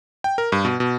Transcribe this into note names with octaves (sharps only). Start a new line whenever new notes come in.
G5
A#4
G2
B2
B2